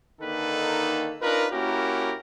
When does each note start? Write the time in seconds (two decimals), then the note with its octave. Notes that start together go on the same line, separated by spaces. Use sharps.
0.21 D3 D#3 A#3 D#4 A4 B4
1.21 D4 D#4 F4 A#4 B4
1.51 A#3 C#4 E4 F#4 G4 A#4